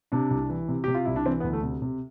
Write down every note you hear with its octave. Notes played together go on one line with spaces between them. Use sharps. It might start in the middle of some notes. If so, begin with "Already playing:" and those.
C3 D4
C2
E3
C3
C3 G4
F4
C2 E4
D4
E3 C4
B3
D2
A3
C3
C3